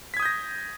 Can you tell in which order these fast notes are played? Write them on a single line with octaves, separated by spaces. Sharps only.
B6 G#6 D#6 G6 A#6